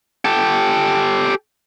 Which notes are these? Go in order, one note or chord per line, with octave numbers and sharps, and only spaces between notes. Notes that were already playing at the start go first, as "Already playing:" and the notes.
G4 A4